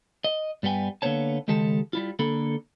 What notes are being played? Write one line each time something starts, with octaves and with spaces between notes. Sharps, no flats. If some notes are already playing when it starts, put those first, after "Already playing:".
D#5
G2 G3 B3 G5 G#5
D3 A#3 B3 C5 C#5 A5
C#2 D#3 G#3 G4 A4 A5
G3 E4 F4
D3 A#3 A4 B5